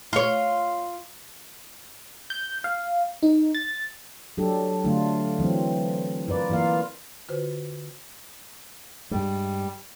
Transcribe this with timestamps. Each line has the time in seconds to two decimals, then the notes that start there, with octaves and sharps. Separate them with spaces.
0.13 F4 C#5
2.30 G6
2.64 F5
3.23 D#4
3.55 A6
4.37 F#3 D4 G4 A4
4.84 D3 F#3 A3 D4 F4
5.39 E3 F#3 C4
6.28 F4 A#4 B4 D5
6.50 E3 A#3 F4 A#4 F5
7.29 D3 F4 F#4 B4 C5
9.11 G2 G3 G#3